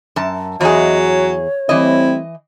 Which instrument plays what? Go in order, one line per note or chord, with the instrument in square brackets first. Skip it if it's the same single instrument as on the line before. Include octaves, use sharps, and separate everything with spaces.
[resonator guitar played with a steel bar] F#2 A5
[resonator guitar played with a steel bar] E2 G#4 [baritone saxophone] F#3 [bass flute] D#5
[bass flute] C#5
[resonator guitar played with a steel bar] E3 D#5 [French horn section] G3 A3 C4 [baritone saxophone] E4